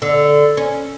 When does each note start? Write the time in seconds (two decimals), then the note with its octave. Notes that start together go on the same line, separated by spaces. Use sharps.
0.02 D3
0.57 C#4